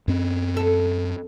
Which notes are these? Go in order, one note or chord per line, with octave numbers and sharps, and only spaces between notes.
F#2 C4
A4